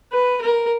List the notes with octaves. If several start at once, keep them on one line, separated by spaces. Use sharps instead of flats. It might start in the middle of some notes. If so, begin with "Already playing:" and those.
B4
A#4